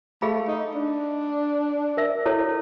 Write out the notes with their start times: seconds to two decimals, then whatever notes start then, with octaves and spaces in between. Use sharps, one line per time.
0.22 A3 G#4 F5 B5
0.48 D#4
0.75 D4
1.97 A#4 E5
2.26 E4 A4 C#5